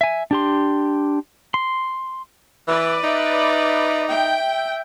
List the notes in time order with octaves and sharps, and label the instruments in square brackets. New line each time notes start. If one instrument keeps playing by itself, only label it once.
[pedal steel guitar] E5 G#5
D4 G4 C6
C6
[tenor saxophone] E3 [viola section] B4 D5
[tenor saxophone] D#4 [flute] E5
[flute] E5 [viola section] G5